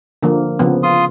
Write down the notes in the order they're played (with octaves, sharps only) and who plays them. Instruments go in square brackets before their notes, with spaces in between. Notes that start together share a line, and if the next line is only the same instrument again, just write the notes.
[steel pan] D3 F3 A#3
C#3 F3 B3
[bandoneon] F4 C6 D#6